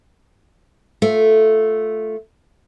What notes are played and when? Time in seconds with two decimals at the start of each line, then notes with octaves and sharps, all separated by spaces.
1.02 A3 F4